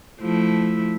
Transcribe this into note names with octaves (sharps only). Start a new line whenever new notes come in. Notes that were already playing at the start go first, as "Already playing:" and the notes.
F3 A3 E4